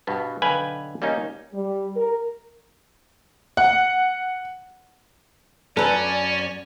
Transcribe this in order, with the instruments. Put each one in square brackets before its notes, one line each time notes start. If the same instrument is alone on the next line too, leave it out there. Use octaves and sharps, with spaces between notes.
[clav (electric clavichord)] G2 B2 B3
B1 D3 B4 F5 G5 G#5
G3 A#3 C#4 D#4
[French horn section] G3
A#4
[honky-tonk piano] F#5
[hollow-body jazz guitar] F#2 B4 [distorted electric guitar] C#4 [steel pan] A4 [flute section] D5